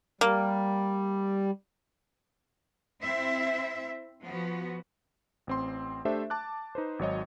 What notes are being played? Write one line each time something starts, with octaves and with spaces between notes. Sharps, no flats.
G3 A#3
C4 E4 C5 E5
F3 B3 F#4
A1 C4 C6
A3 D4 G4 A4 C5 E5
A5 D6 F#6
D#4 B4 C5
G#1 F#3 C#5 D#5